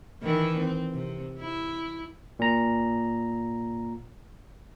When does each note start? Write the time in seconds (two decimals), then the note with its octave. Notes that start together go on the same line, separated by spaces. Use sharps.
0.22 D#3 E3 E4
0.57 C4
0.93 C3
1.39 E4
2.39 A#2 A#5